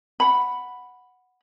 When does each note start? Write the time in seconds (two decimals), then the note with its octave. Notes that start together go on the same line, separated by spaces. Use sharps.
0.20 F#5 B5